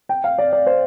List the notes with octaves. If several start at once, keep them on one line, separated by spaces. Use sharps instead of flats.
G5
F5
D5
D5
C5